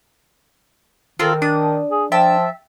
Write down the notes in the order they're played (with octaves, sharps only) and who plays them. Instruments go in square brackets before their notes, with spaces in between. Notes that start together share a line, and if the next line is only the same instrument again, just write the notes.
[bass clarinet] D#3 [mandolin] C4 A4 A#4 [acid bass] F4
[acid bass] D4 [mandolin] D#6
[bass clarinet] G#4
[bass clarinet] F3 [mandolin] E5 G5 A5